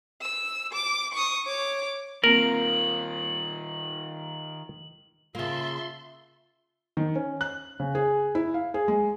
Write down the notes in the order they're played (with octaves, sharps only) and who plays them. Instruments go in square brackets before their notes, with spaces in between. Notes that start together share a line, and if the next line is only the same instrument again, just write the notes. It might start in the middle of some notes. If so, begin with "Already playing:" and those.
[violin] E6
D6
C#6 D#6
C#5 D6
[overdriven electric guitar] D#3 F4 [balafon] A#3 C4 [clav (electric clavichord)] A#4 [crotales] F#7
[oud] C#3 A#3 [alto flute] F4 [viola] E5 A5 [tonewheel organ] C6
[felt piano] D#3
C#4
F#6
C#3
G#4
E4
F5
G#4
G#3